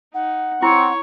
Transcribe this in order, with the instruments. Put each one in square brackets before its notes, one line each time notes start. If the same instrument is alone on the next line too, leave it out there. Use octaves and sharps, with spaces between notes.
[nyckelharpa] D#4 [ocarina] F#5
[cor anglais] C4 [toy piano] E4 [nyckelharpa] C#5 C#6